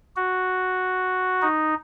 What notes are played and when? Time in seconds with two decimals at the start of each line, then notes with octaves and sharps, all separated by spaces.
0.16 F#4
1.42 D#4